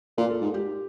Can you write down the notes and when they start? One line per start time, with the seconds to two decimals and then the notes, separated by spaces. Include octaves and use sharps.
0.17 A#2 A#4
0.30 A4
0.41 G#2
0.54 G4